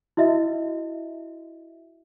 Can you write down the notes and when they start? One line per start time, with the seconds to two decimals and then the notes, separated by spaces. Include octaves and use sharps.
0.17 E4 F#4 D#5 E5